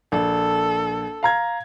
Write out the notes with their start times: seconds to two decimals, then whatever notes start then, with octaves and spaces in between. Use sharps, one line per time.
0.12 A#1 A4
1.23 F5 A#5 G#6